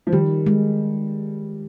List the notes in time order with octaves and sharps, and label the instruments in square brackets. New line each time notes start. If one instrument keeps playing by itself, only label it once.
[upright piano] F3
[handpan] D#3 [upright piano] G3
[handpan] G#3